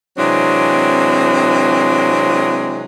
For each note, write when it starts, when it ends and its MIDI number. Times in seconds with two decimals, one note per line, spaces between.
0.18 2.84 48
0.18 2.84 52
0.18 2.84 54
0.18 2.84 56
0.18 2.84 60
0.18 2.84 62